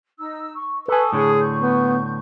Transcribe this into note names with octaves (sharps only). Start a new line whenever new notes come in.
D#4 E6
C#6
A4 B4 G#5 A5 C#6 D#6
A2 D3 G#4 C#5
C#6 G6
B3